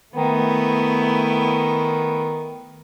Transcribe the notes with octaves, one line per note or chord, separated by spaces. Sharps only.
D#3 A3 B3 E4